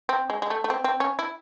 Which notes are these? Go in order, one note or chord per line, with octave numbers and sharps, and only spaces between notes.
C4
G#3
G#3
A3
A3
C4
C4
C#4
E4